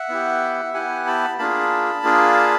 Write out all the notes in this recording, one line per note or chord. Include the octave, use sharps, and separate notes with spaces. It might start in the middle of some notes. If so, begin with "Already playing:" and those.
Already playing: E5 F#5
B3 E4 G4
B3 E4 G4 F#5 G#5
A5 B5
A#3 D4 F4 G#4 A5 B5
A#3 D4 F4 G#4